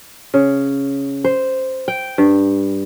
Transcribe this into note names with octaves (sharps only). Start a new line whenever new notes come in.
C#3
C5
G5
G2